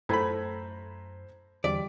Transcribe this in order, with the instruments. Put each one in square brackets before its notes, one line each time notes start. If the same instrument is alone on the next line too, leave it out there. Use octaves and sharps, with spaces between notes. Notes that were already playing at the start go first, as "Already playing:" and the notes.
[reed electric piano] F#2 [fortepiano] A2 A3 B5 [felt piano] C5 A#5 G#6
[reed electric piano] E2 D3 E3 [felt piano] G3 B6 [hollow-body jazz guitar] D5